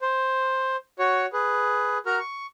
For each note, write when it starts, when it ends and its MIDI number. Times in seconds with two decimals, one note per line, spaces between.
0.02 0.76 72
0.99 1.26 66
0.99 1.26 73
1.33 1.98 68
1.33 1.98 71
2.06 2.19 66
2.06 2.19 70
2.06 2.19 82
2.06 2.19 89
2.19 2.46 85